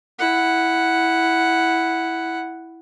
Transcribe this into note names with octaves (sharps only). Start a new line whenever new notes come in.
E4 F#5